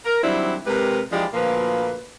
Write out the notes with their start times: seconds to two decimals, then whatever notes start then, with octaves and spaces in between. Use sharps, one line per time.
0.05 A#4
0.24 D#3 F#3 G3 C4 D4 E4
0.67 C3 G#3 C4 G4 A#4 B4
1.12 E3 F3 G#3 D4 G4
1.34 D2 A#2 F3 A#3 B4